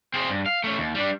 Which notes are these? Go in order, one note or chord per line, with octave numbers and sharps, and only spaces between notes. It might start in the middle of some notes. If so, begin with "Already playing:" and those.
C4 G#4
G2
F5
A3 C#4
D#2
G3 D4